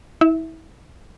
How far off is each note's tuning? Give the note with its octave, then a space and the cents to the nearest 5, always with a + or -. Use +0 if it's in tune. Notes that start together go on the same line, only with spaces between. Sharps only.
E4 -35 E5 +0